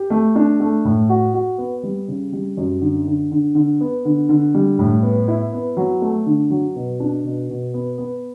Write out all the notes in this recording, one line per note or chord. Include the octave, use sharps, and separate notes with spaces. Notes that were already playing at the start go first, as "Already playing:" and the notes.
Already playing: G4
A3
D4
A3
A2
F#4
F#4
B3
G3
C#3
G3
F#2
D3
D3
D3
D3
B3
D3
D3
G3
A2
B3
E4
B3
F#3
A3
D3
F#3
B2
D4
B2
B2
B3
B3